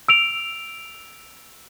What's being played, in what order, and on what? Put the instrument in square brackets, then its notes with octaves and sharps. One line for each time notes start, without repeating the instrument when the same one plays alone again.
[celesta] E6 D7 F7